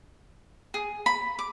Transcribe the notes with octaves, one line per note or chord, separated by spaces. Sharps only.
G#4
B5
D6